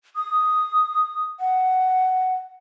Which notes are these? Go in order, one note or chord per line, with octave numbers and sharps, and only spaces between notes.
D#6
F#5